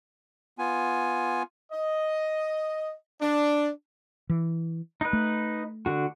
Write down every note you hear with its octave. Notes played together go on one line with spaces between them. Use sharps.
B3 F4 G#5
D#5
D4
E3
D#4 B4
A3
D3 F#4